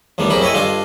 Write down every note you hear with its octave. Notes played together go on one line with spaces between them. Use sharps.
A1 E2 D#3 G3 D4
C2 F#2 G4 G#4 A#4 B5
E4 A4 B4 C#5 D#5 G#5
G2 D4 F4 A4 D#5 A5